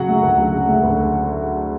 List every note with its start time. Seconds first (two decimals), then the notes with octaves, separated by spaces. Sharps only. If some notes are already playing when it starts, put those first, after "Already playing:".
Already playing: C#3 F#3 F#4 F#5
0.09 A3
0.23 D2
0.38 F#3
0.53 C#3
0.68 A3
0.83 D2